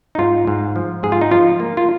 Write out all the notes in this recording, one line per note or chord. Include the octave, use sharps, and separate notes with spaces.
D#4
G#2 F4
G#2
F3
G#2 G#4
F4
D#4
F3 F4
A#3
F4